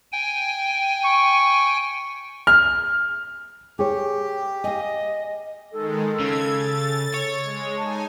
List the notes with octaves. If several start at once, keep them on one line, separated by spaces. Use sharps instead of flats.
G5 G#5
C#6
F6
G4 G#4 C#5
D#5 F5 G#5
D#3 G#3 A4
C#3 G#6
A6
C#5
G#3
D#4 G#5 A5